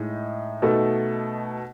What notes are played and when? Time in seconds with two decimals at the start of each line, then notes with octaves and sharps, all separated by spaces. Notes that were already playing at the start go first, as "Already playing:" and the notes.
Already playing: A2 G#3 D#4
0.62 B2 A3 D#4 A4